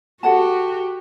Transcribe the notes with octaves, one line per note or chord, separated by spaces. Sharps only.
F#4 G4 A4 F#5 A5